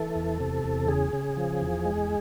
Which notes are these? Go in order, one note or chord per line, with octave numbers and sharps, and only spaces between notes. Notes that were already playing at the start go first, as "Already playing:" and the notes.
Already playing: E3 A4
E2
C3
E2
C#3 G#4
C#3
F3
E2
G#3